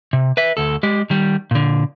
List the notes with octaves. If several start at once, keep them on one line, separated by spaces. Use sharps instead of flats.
C3
B4 E5
D2 A4
G#3 G4
D#3 G3
A#2 D3